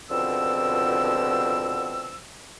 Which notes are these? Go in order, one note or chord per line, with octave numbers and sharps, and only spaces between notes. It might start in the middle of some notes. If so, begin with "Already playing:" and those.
C#2 B2 D3 F3 C4 E6